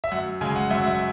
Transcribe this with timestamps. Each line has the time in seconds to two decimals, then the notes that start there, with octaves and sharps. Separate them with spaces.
0.04 E5
0.11 F#2 F#5
0.41 C#3 G#3 G#5
0.56 F#5
0.71 F#2 E5
0.79 F#5
0.87 E5